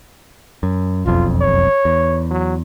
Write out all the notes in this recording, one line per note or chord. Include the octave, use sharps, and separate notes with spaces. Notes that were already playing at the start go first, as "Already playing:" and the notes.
F#2
E1 B1 F2 F4
C#5
E2
F#3